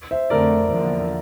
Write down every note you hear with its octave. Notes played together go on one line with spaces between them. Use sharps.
C5 E5
F2 D3 A3 C4 A#4 D5
E2 D3 F3 A#3